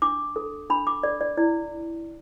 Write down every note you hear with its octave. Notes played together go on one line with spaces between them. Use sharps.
D4 D6
A4
D4 B5
D6
A4 D5
D5
E4 D5